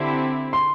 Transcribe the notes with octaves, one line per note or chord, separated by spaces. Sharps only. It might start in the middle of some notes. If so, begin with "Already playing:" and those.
Already playing: D3 C4 E4 G4
C6